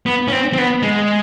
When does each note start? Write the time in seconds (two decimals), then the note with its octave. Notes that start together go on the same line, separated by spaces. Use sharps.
0.06 B3
0.28 C#4
0.32 C4
0.53 C4
0.58 B3
0.83 G#3